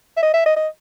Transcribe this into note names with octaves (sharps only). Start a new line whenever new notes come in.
E5
D#5
E5
D#5
D#5